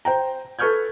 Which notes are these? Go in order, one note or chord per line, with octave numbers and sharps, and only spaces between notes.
C5 G5 A#5
A4 B4 C#6 F6 G6 G#6